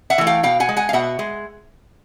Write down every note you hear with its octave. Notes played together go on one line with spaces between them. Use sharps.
E5 F#5
E3 A3
F5 G5
B2 F5 G5
F#5 G#5
G#3
F#5 G#5
F5
B2 E5 F#5
G#3